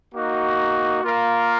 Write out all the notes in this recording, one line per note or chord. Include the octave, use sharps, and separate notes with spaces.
A#3 D#4 F#4
A#3 F4 A#4 F5